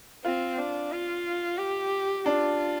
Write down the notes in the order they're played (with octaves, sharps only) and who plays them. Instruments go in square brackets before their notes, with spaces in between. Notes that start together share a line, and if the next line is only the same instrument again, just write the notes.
[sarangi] C4 [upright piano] F4
[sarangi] D4
F4
G4
[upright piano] D4 [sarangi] F4